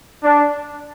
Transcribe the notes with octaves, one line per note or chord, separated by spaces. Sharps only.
D4